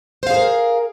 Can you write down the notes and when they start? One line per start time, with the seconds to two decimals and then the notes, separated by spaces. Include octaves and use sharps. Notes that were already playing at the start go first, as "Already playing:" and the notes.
0.23 C5
0.27 F5
0.30 G#4
0.34 A#4